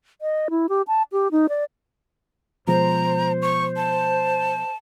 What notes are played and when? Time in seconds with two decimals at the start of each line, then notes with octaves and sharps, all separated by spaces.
0.21 D#5
0.50 E4
0.69 G4
0.88 A5
1.12 G4
1.32 D#4
1.49 D5
2.67 B2 F3 G#3 C5 A#5
3.42 C#6
3.77 A5